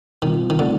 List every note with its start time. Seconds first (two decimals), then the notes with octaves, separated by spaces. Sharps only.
0.22 B2 D#3 G3 C4 F4
0.50 D#3
0.59 D3 F#3 A3 C4 D#4